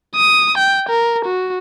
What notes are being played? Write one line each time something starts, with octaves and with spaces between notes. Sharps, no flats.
D#6
G5
A#4
F#4